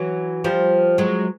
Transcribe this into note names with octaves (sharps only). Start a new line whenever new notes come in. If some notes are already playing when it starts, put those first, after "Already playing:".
Already playing: E3 F#3
F3 G3
F#3 G#3